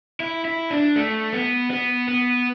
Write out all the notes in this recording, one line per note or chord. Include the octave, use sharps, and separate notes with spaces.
E4
E4
D4
A3
B3
B3
B3